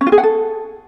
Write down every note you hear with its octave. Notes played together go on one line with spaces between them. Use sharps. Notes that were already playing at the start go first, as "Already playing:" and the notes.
C#4
F4
G#4
F#5
A4